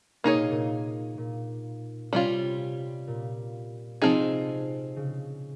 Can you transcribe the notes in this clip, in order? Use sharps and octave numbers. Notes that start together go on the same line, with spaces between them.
C3 A#3 D#4 G#4 C#5
A#2
A#2
A#2
C3 G3 C#4 F4
A#2
C3 F3 C4 D#4 G#4
C#3